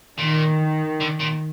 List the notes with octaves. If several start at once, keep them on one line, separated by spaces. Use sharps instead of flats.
A#2 D#3
D3
A#2